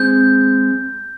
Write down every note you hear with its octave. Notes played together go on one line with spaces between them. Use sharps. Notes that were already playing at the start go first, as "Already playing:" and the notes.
Already playing: G#3 C4 G6